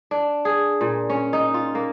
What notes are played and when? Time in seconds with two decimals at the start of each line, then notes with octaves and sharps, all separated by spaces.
0.11 D4
0.45 G#4
0.81 A#2
1.10 C#4
1.33 D#4
1.54 F4
1.75 A#3